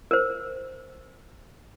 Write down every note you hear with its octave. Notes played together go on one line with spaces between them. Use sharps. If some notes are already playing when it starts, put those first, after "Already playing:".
A#4 C5